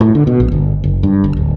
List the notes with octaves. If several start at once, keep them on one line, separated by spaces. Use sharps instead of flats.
A2
D3
B2
A#1
G1
F#1
G2
G1
D1